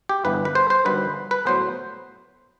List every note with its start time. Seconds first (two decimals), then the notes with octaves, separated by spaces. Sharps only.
0.09 G4
0.25 G1 G2 E3 B3 B4
0.45 B4
0.55 C5
0.70 C5
0.85 G1 G2 D#3 F#3 B4
1.31 B4
1.46 A2 F#3 B3 C5